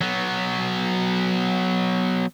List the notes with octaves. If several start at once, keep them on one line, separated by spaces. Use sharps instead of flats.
F#3 B3